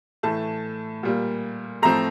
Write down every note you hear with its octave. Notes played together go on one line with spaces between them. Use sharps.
A2 E3 A3 A5
A#2 G3 A#3
A2 F3 A3 C4 A#5